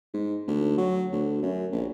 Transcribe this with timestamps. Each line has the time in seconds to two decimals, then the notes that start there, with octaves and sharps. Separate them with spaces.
0.14 G#2
0.47 D2
0.78 F#3
1.12 D2
1.42 F#2
1.73 A#1